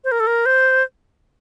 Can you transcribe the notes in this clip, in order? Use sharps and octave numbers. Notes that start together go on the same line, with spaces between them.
C5
A#4
A4
A#4
C5